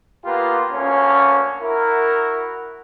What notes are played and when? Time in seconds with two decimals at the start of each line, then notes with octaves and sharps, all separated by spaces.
0.25 A#3 B3 F4 G4 B4
0.72 D2 A#3 C#4
1.62 E4 F#4 A#4